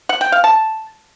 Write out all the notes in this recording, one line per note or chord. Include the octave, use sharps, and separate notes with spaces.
F#5
G5
F5
A5